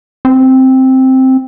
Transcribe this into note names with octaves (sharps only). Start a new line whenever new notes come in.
C4